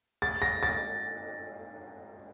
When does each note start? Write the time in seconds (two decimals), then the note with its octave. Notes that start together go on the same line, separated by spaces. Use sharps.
0.22 A6
0.42 A#6
0.63 A6